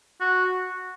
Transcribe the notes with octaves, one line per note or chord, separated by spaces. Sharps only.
F#4